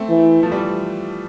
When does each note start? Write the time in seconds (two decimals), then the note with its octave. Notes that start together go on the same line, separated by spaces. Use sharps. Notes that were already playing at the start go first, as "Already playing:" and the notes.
Already playing: A3 C4
0.10 E3
0.43 F3 A3
0.52 E3 G3